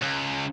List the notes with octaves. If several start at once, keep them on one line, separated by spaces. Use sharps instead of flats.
C#2